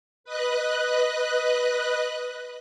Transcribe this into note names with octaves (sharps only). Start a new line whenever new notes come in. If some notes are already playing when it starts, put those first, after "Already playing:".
B4 D#5 F#6